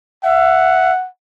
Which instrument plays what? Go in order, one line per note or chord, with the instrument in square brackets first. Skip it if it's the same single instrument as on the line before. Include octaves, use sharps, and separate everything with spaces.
[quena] E5 [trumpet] F#5